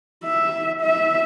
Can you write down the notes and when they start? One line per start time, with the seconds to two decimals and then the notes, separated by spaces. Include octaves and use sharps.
0.24 E5
0.82 E5